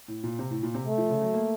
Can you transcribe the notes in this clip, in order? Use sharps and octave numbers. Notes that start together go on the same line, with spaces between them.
A2
A#2
C3
A2
A#2
C3
A3
F3
C#3
F#3
A#3